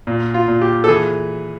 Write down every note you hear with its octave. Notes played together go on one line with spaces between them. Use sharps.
A#2
F4
A#2
G4
A4
E3 G#4